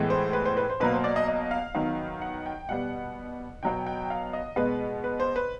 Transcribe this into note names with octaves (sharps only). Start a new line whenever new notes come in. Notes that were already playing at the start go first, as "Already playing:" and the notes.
Already playing: A2 E3 G#3 B3
C5
B4
C5
B4
C5
B2 F#3 A#3 B4
C5
D5
D#5
D#5
F5
D#3 F#3 B3
F#5
G5
B2 G3 B3 F#5
B2 F#3 B3 G5
G5
F5
D#5
B2 G#3 B3 B4
B4
C5
B4